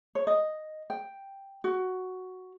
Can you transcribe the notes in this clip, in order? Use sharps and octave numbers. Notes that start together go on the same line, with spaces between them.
C#5
D#5
G5
F#4